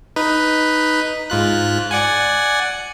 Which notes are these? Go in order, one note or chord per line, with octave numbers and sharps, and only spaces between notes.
D#4 B4
G#2 F4 F#6
D5 F#5 G#5